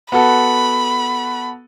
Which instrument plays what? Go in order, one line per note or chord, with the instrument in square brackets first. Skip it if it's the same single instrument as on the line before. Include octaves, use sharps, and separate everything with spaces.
[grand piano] B3 F#4 A4 [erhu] B5